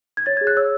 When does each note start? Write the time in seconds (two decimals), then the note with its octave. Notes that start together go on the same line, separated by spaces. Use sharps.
0.17 G#6
0.26 C#5 A6
0.37 G#6
0.41 G#4
0.47 F#6
0.57 C#5 E6